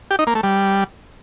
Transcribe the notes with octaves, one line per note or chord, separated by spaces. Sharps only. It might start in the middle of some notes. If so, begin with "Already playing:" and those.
G4
D#4
A#3
A3
G3